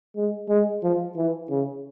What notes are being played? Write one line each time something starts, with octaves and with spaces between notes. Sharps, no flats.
G#3
G#3
F3
E3
C#3